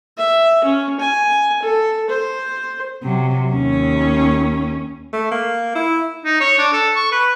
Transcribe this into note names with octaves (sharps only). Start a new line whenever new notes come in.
E5
C#4
G#5
A4
C5
C3 F#3
D#2 C#4
A3
A#3
E4
D#4
C#5
D4
A4
C#6
B4